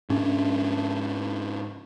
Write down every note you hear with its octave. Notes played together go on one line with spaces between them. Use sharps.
G#2 C#4 D4